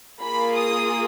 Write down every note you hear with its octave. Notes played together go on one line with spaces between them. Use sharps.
A#3 F4 G#4 B5
D#6